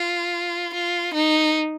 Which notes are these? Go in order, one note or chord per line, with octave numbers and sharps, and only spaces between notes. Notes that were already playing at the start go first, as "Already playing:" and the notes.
Already playing: F4
F4
D#4